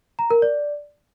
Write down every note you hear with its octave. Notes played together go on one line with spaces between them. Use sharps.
A#5
A#4
D5